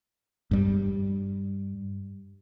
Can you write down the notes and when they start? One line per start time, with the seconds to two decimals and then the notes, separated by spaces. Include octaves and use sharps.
0.51 G2 G3